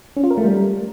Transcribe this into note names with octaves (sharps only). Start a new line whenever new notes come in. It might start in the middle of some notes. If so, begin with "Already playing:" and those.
C#4
F4
A#4
A3
G3